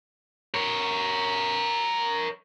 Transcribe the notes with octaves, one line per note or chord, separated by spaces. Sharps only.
A#4 C#5